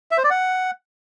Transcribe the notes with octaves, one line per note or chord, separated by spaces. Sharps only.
E5
C5
D5
F#5